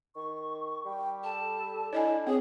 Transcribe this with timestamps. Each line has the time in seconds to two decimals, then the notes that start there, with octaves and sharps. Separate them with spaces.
0.16 D#3 C#6
0.85 G3 G5
1.24 A4 A5
1.93 D4 E4 C#5 D#5 G#5
2.27 C4 G#4 C#5